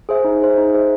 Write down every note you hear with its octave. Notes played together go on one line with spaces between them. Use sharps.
G#4 C5 E5
D#4
G#4 C5 E5
D#4
G#4 C5 E5